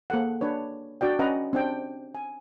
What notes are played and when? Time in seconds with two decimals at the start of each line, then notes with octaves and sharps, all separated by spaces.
0.10 A#3 G#4 A4 F#5
0.41 D4 B4 C#5
1.01 D4 F#4 D5 G5
1.19 C#4 B4 D#5 F#5 A#5
1.53 C4 D4 G5
2.15 G#5